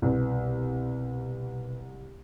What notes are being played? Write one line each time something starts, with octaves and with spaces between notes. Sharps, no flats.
C2 B2 B4